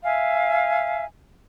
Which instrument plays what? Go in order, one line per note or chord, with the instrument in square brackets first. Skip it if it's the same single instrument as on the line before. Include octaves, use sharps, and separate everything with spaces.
[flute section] E5 F5 G#5